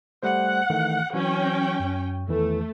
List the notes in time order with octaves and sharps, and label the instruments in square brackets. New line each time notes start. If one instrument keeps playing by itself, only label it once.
[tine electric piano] G3 A3 C5 [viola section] F#5
[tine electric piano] D#3 E3 A3
[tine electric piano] E3 F#3 [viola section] C#4 G5
[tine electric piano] F#2
[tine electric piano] E2 D#3 E3 [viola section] A3